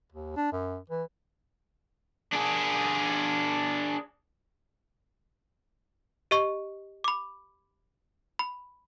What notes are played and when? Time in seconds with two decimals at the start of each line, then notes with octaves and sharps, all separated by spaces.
0.12 D#2
0.37 D4
0.53 F#2
0.90 E3
2.33 D4 G#4
6.31 G4 D#5 C#6
7.04 B5 D6
8.39 B5